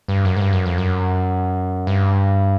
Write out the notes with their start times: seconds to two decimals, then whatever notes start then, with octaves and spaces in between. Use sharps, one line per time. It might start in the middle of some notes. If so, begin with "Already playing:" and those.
0.08 G2
0.25 F#2
0.36 G#2
0.41 G2
0.53 F#2
0.66 F2
0.78 F#2
1.87 G2